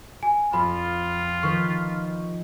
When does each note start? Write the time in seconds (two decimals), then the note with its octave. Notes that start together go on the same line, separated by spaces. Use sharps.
0.23 G#5
0.53 F2 F4 B5
1.43 D#3 F3 B4 C#6